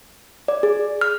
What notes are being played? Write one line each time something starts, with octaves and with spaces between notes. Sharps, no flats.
D5
G#4
F6